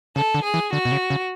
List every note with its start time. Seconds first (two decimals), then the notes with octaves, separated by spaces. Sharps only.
0.16 C#3 A4
0.34 D3
0.44 G#4
0.54 E3
0.72 D3 F#4
0.85 B2
0.92 C#3
1.10 C#3